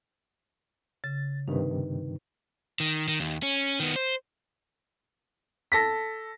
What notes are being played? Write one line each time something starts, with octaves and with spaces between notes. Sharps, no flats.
C#3 A6
G2 C3 D#3 D#4 B4
D#3
D#3
D#2
C#4
D#3 B3
C5
A4 A#6 B6